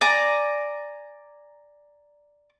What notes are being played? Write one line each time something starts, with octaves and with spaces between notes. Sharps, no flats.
D5 G#5 A#5